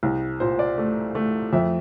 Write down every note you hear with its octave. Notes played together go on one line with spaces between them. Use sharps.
C2
A#2 C5
D5
A3
A3
F2 E5